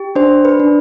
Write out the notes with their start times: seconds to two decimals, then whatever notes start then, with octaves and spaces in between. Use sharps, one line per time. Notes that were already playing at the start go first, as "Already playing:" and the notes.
Already playing: G4
0.16 D4 C5
0.45 B4
0.60 D4